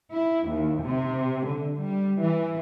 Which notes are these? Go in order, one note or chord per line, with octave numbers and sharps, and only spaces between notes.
E4
D#2
C3
D3
G3
E3